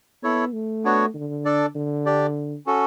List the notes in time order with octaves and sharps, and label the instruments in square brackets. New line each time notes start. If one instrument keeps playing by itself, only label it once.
[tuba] B3 [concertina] E4 A4 C#5
[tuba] A3
[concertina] B3 D4 F#4 C#5
[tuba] D3
[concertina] D4 A4 D5
[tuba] D3
[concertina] D4 G4 D5
C#4 F#4 A4